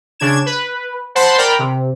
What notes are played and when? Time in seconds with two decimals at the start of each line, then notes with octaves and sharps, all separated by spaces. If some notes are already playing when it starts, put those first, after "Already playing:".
0.20 C#3 D4 G#6 E7
0.46 B4
1.15 C5 F#5 A5 B5 C6
1.38 A#4 D5 G5 A#5 B5
1.59 C3